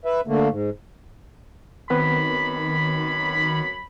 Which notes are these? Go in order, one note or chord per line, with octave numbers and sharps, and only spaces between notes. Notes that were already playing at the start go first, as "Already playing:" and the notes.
B4 E5
D3 A3 A#3
G#2
F#2 D#3 F#3 B3 C4 B4 B5